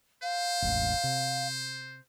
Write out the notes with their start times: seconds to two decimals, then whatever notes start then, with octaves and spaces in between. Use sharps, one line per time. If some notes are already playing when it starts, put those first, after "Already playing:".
0.23 C5 F5
0.62 E1 A1
1.04 C3